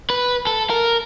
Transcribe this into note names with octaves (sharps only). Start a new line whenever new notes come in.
B4
A4
A#4